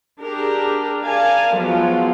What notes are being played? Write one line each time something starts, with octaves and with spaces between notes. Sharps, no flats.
D4 G4 G#4 A#4
A#4 D5 F5 G#5 A5
F3 F#3 G#3 B3 F4